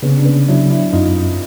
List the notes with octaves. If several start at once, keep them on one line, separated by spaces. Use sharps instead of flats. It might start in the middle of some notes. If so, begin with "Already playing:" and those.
C#3 B3 C#4
D4
B3 C#4
F#3 D4 E4
D4 E4
F#2 D#4 F4